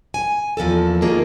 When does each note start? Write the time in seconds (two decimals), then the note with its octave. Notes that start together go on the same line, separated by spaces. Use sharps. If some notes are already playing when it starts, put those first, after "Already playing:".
0.14 G#5
0.57 E2 F3 A#3 A4
1.02 D#3 A3 A#3 F4 G#4